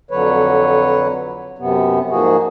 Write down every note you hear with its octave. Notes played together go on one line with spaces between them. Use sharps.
F2 D3 F#3 B4 C#5
F#2 C3 B3
G#2 F3 A#3 F#4 G#4